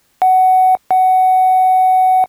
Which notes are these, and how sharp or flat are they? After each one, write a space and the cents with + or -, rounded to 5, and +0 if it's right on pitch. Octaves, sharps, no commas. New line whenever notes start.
F#5 +15
F#5 +15